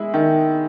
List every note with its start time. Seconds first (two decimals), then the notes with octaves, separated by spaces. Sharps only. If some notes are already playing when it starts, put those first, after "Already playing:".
Already playing: G#3 E4
0.14 D#3